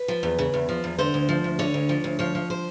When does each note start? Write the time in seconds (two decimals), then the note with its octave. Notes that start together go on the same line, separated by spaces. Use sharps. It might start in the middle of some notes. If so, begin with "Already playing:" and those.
Already playing: B4
0.08 F3
0.23 E2
0.39 C#3
0.54 E2
0.69 F3
0.84 E2
0.99 D3 C5
1.14 D2
1.29 F3
1.44 D2
1.59 D3 C#5
1.74 D2
1.89 F3
2.04 D2
2.19 F3 C#5
2.35 F3
2.50 C5